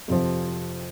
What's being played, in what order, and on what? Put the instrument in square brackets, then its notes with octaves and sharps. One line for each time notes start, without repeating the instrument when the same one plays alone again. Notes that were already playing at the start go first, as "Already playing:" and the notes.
[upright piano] F2 C3 F3 C4